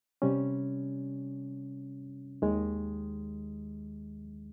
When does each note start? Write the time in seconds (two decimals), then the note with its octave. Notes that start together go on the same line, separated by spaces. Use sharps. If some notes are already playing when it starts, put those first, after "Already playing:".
0.22 C3 G3 C#4
2.42 D#2 D#3 G#3